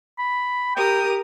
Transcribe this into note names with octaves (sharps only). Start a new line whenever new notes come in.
B5
G4 A#4 G5 D#6